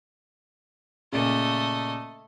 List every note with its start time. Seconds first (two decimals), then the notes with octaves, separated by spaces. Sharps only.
1.12 A#2 C#3 A3 D#5